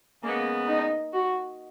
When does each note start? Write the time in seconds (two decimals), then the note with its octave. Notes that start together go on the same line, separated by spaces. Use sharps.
0.23 C#3 G#3 A#3 B3
0.67 D#4
1.13 F#4